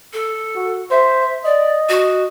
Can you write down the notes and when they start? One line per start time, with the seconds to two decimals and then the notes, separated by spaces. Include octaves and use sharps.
0.13 A4
0.56 F#4
0.91 C5 E5
1.45 D5 D#5
1.89 F#4